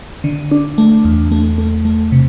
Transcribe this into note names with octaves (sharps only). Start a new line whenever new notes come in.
D3
D4
A3
E2
A3
A3
A3
C3